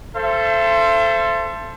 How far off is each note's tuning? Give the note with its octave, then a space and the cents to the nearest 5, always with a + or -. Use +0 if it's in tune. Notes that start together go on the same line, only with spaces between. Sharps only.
A4 +0 C5 +0 E5 +40